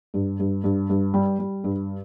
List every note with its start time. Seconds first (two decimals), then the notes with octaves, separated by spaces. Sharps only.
0.14 G2
0.39 G2
0.64 G2
0.90 G2
1.14 G3
1.39 G3
1.64 G2